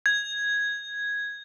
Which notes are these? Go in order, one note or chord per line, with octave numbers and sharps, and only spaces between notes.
G#6